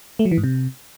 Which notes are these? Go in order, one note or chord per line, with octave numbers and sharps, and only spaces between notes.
A3
F#3
E3
G#2
C3